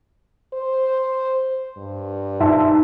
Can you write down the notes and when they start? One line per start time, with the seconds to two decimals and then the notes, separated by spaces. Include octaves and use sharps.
0.53 C5
1.77 G2
2.40 G#2 E5 A5